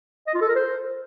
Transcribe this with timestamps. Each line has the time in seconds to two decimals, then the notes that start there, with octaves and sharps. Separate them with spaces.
0.27 D#5
0.34 F4
0.41 A4
0.48 A#4
0.55 C5